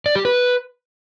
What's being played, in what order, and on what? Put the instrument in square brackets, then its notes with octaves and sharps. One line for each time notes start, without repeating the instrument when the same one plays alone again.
[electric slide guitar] D5
G4
B4